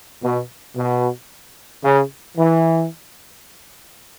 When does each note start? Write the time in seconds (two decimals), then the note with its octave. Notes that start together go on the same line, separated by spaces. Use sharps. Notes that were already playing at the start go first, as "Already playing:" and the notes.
0.22 B2
0.76 B2
1.83 C#3
2.37 E3